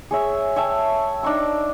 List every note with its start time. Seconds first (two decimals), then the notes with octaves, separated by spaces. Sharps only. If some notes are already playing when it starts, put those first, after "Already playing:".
0.11 G#4 C#5 E5
0.56 C#5 E5 G5 A5
1.23 D4 D#4 C#6 E6